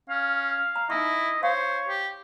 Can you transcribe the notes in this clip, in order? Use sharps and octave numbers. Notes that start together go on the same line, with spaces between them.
C#4 F5
A#5
D#4 E4 D#5 C#6
C5 C#5 F5
G4